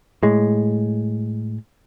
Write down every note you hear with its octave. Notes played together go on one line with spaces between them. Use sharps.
A2 G#3